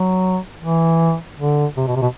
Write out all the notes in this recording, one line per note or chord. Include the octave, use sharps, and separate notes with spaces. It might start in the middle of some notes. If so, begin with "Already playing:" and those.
Already playing: F#3
E3
D3
C3
B2
C3
B2